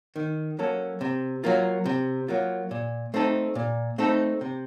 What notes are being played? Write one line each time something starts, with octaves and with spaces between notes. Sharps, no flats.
D#3
F#3 A#3 C#4 A4
C3
F#3 A#3 F4
C3
F#3 A#3 F4
A#2
A3 C4 D#4 A4
A#2
A3 C4 D#4 A4
C3